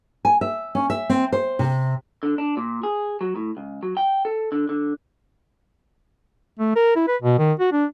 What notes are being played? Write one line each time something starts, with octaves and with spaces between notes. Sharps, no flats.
G#5
E5
C#4
E5
C4
C5
C3
D3
D4
A#2
G#4
F#3
A2
C#2
F#3
G5
A4
D3
D3
A3
A#4
E4
B4
B2
D#3
F#4
D4